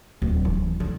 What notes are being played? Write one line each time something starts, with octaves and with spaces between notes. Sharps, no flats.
D1
E3
D3